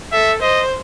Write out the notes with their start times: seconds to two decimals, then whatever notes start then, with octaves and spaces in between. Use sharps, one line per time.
0.12 A4 E5
0.41 C5 D#5